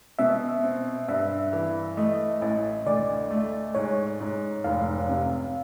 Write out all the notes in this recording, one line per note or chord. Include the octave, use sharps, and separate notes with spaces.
B2 E5
C4
G2 E5
E3
A3 D#5
A1
D2 D5
A3
G#2 C#5
G#2
F1 F5
C3